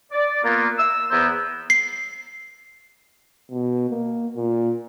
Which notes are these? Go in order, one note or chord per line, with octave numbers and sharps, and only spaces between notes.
D5
A#3 B3 F4
E6
E2 B3 E4 C5 A#5 E6
C7
B2
A#3
A#2